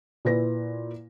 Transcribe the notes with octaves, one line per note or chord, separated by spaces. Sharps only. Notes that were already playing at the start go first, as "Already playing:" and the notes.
A#2 E4 B4 A#6